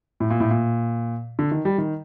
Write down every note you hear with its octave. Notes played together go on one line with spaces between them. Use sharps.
A2
A#2
A2
A#2
D3
D#3
G3
D#3